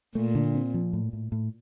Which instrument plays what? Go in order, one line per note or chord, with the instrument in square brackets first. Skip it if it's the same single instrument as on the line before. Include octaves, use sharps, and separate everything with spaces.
[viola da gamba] A#2 [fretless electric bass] A3
[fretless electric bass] D3
C4
F3
A2
A2
A2